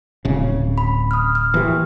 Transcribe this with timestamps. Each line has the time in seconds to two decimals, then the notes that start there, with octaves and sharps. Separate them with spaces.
0.25 D1 C#3
0.78 B5
1.11 D#6 F6
1.35 F6
1.54 E3 A#3 G4